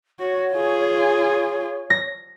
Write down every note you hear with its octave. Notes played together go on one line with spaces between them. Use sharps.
F#4 C#5
F4 G#4
A#6